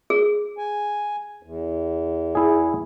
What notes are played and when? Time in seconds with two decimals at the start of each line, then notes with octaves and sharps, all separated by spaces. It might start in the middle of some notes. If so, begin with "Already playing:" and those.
0.10 G#4
0.58 G#5
1.43 E2
2.35 E4 G#4